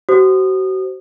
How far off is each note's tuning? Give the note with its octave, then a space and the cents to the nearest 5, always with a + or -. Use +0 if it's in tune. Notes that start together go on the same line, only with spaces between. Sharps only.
F#4 +35 C5 +0 D#6 -25